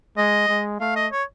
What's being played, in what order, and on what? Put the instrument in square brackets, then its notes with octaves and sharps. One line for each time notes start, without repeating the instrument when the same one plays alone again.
[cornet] G#3 [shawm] D#5
[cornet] G#3
[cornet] A3 [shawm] F5
[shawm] D#5
C#5